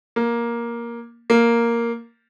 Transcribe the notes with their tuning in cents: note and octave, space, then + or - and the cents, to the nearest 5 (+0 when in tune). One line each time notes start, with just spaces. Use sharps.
A#3 +10
A#3 +0